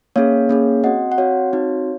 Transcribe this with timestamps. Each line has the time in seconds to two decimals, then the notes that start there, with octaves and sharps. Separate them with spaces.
0.16 A#3 C#4 G#4 C#5 F5
0.49 A#3 C#4 G#4
0.83 C4 F#4 D#5 F#5
1.12 F#5
1.18 C4 F#4 C#5 F5
1.53 C4 D#4 F#4